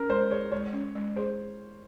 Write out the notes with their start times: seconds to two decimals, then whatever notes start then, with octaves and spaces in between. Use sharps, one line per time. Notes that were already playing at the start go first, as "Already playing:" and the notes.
Already playing: C#4 A#4
0.09 G#3 C5
0.30 G#4 C#5
0.52 G#3 C#5
0.73 C#4
0.95 G#3
1.16 G#4 C5